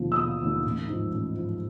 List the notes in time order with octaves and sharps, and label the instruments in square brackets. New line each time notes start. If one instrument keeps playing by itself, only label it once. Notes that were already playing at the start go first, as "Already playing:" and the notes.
Already playing: [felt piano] E1 D#2 D3 F3
E6
E1 D#6
D#2 D3 F3
A1
G#2 F3
A1
G#2 F3